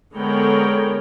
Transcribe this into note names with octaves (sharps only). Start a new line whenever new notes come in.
D3 G#3 B3 A#4 C#5 G5